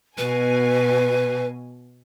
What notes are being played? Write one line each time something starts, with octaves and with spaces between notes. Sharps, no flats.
B2 B4 G#5